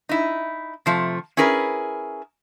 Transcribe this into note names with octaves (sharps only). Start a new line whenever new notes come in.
D#4 E4
C3 F3 A3
C#4 E4 G#4 A#4 B4